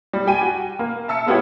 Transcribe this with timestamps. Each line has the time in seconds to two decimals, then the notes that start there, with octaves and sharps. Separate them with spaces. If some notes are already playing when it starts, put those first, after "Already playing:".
0.13 G3
0.27 G4 G5 G#5 D#7
0.41 F#4
0.79 A#3
1.08 E5 A5 E6 C#7
1.26 G#3 A#3 B3 E4 G4 C#5